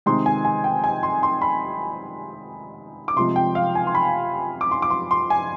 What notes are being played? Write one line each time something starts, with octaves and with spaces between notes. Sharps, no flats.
C3 D#3 G#3 C4 D#4 C6
G#5
G#5
G5
G#5
C6
C6
B5
D6
C3 F3 G#3 C6
G5
F5
G#5
C6
B5
D6
C6
D6
C6
C6
G#5